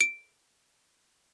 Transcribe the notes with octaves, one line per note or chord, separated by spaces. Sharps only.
D7